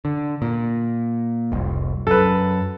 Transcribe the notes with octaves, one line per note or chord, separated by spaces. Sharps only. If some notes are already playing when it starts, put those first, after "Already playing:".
D3
A#2
F1 C2
F#2 A4 B4